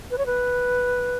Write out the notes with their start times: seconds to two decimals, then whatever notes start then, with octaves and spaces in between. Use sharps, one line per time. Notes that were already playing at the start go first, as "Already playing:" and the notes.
0.11 B4
0.18 C#5
0.26 B4